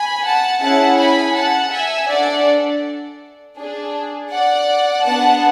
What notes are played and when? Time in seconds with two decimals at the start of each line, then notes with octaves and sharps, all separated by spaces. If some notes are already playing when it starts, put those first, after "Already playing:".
Already playing: G#5 B5
0.24 F#5 A5
0.61 C#4 E4 G#4 F#5 A5
0.98 G#5 B5
1.35 F#5 A5
1.72 E5 G#5
2.09 D4 A4 D5 F#5
3.58 D4 G#4
4.32 D5 F#5
5.06 B3 D4 G#4 F#5 A5